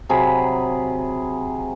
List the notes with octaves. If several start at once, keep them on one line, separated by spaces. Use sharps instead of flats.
C3 F#3 G#4 B5